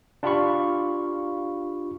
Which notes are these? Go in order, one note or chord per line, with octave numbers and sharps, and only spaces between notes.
D4 F4 G4 F5 B5 C#6